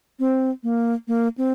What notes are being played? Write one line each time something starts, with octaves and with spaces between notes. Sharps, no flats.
C4
A#3
A#3
C4